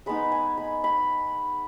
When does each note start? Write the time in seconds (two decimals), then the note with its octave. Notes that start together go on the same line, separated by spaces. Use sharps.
0.06 G#3 B3 D#4 B5
0.32 G#5
0.57 B5
0.84 B5